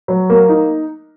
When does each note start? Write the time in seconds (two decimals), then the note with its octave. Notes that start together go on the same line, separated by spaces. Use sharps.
0.08 F#3
0.30 A#3
0.49 D#4